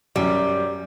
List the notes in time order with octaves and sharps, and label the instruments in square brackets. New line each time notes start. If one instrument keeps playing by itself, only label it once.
[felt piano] F#2 F#3 [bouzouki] G3